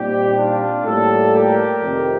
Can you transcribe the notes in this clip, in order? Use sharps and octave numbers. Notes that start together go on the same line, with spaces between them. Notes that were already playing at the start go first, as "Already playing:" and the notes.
Already playing: A#2 G3 C4 D#4 G4
D4 F4
A2 G3 A#3 F4 A4
G4 A#4
F2 C3 D#3 A3